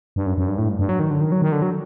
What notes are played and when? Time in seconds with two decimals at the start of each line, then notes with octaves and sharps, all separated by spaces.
0.16 G2
0.26 F#2
0.38 F#2
0.48 G2
0.58 A2
0.69 G2
0.79 G2
0.89 F#3
0.99 D#3
1.11 D3
1.21 D#3
1.32 F#3
1.42 D#3
1.52 D3
1.62 F#3